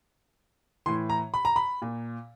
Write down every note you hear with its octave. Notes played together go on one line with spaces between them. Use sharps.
A2 E3 C6
A#5
B5
A#5
B5
A#2